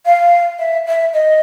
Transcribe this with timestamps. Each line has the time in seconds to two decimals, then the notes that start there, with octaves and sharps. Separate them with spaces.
0.06 F5
0.59 E5
0.86 E5
1.13 D#5